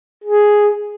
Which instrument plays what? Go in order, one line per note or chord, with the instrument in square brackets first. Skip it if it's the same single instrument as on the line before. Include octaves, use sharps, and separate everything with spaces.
[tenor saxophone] G#4